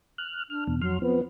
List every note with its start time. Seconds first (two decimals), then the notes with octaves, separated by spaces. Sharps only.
0.18 F6 F#6
0.50 D4 F6
0.67 E2 B2
0.82 F2 F#3 C6 F6
1.02 F3 B3 C4